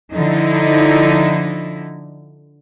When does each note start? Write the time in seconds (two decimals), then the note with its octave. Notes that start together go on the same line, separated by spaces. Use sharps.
0.13 D3 F3 D#4 E4